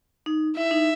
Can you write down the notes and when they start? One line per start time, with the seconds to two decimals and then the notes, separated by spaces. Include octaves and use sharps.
0.26 D#4
0.57 E4 E5
0.71 D#4